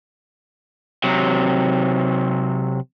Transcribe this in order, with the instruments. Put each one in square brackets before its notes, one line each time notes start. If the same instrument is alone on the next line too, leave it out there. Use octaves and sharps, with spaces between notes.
[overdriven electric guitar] C3 F#3